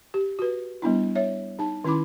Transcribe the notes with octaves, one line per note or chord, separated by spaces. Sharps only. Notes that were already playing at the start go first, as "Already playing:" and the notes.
G4
F#4 B4
G3 B3 D4 E4
C#5 E5
D#4 A5
D#3 C#4 E4 B5 D6